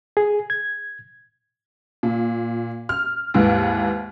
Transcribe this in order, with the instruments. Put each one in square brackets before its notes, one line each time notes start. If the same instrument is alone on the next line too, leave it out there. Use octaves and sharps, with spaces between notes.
[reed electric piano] G#4
G#6
[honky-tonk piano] A#2
F6
D#2 G#2 E3